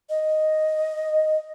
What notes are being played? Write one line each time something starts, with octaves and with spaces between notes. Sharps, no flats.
D#5